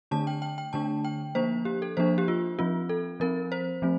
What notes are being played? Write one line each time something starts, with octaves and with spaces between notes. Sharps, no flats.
D3 A3 D4 A5
G5
G5
G5
D3 A3 D4 A5
G5
F3 A#3 D4 C5
G4
A4
F3 A#3 D4 C5
G4
F4
F3 C4 F4
A4
F3 C4 A#4
C5
F3 A3 C4